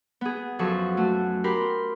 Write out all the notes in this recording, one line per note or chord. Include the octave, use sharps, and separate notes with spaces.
B3 G#4
F#2 F3 F#3 A4 C#6
A3 F#4
G4 A#4 B5 C6